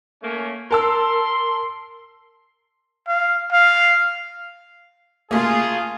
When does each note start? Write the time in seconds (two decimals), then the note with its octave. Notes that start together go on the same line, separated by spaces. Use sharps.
0.22 A3 A#3 C#4
0.71 A#4 A5 C6 E6
3.08 F5
3.52 F5
5.31 C#3 A3 A#3 F4 G#4